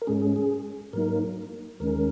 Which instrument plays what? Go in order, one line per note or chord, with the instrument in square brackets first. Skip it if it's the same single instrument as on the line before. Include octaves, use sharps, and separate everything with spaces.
[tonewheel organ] A#4
G#2 G#3 C#4 G#4
G#4
G#4
G#2 F#3 A#3 D#4 A#4
D#2 D#3 G#3 C#4 A#4